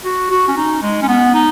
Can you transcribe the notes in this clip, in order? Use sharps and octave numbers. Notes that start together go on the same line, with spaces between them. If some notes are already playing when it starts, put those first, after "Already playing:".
F#4
F#4
C#4
D#4
G#3
C#4
B3
D#4